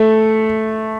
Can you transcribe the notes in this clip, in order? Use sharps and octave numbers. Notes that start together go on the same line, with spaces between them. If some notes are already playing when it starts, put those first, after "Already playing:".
Already playing: A3